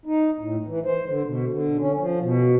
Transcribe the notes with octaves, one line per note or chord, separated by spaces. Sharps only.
D#4
A2
E3
C5
D3
B2
D3
C#4
F3
B2